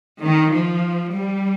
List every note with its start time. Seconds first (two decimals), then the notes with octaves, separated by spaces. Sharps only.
0.23 D#3
0.53 F3
1.14 G3